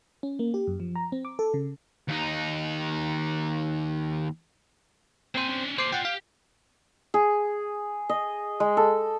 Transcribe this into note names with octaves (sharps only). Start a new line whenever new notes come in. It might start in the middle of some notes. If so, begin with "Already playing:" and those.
C#4
A#3
G4
F#2
F3
A#5
C4
D6
A4
C#3
D#2 D#4
A#3 C4 C5 G#5
C#4 D4
A#3 G#4 C5 D6 C7
F4 D5 F#5 G5
G4 F5
G#4
D#5
G#3
A4